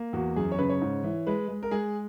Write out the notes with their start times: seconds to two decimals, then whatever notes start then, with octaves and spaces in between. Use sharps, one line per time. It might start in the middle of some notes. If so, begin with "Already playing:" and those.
Already playing: A#3
0.13 E2 F#4
0.36 F#2 G#4
0.52 C#5
0.58 C#3 B4
0.69 C#5
0.81 G#2
1.04 E3
1.27 G#3 B4
1.49 G#3
1.63 A#4
1.71 G#3 G#4